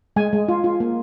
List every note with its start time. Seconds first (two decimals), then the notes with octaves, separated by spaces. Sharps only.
0.16 G#3 G#5
0.33 G#3
0.48 F4
0.64 F4
0.80 A#3